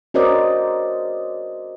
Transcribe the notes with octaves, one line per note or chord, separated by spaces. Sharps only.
C#4 F#4 A#4 C5 D5 D#5